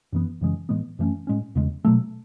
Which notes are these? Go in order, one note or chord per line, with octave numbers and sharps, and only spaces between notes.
F#2 E3 B3
F#2 C#3 E3 G#3
A2 E3 G#3 B3
F#2 E3 A3 C#4
A2 G#3 C#4
E2 C#3 G#3
B2 F#3 A3